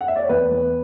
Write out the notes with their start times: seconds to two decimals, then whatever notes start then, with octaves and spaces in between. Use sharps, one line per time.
0.01 F#5
0.08 E5
0.15 D5
0.22 C#5
0.29 E2 B4
0.51 E2